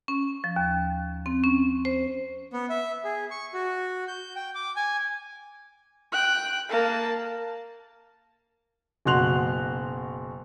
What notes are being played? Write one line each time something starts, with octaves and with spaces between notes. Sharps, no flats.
C#4
F3
D#2
C4
C#4
C5
B3
E5
G#4
C#6
F#4
G6
G5
D6
G#5
G5 F#6
A#3 A5
F#1 B2 F#4 C6 F#6 F7